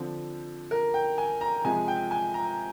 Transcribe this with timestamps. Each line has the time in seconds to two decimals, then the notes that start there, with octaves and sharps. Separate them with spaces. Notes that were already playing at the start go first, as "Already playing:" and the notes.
Already playing: D3 F3 C4
0.71 A#4
0.94 G5
1.18 G#5
1.41 A#5
1.64 C3 F3 G#3 G#5
1.88 G5
2.11 G#5
2.34 A#5